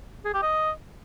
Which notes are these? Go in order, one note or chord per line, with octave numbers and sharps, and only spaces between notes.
G#4
G4
D#5